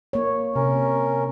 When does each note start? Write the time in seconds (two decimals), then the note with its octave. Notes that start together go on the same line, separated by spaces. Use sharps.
0.13 A#3 C#5
0.56 C3 C#4 A#4